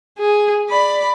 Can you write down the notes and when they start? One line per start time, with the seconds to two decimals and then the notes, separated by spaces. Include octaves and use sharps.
0.19 G#4
0.69 D5 B5